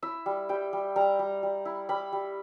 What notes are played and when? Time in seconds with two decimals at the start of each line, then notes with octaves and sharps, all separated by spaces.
0.02 E4 E5
0.26 G3
0.49 G3 G5
0.73 G3
0.96 G3 A#5
1.19 G3
1.43 G3
1.65 E4
1.89 G3 B5
2.12 G3